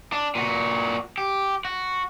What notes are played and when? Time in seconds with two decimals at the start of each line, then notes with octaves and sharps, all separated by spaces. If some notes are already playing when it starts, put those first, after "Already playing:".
0.13 D4
0.35 A#2 F#4
1.18 G4
1.65 F#4